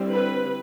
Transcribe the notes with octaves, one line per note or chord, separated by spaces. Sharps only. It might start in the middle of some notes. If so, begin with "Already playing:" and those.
Already playing: D3 G3 C4 E4
B4